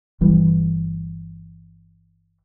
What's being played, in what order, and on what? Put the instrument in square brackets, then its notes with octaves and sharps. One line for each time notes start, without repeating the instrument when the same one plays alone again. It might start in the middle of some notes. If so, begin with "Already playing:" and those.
[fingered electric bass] G1 E3 G3